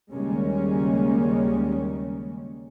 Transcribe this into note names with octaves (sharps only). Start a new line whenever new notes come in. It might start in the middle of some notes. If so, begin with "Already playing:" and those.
D#2 C#3 G3 G#3 A#3 C#4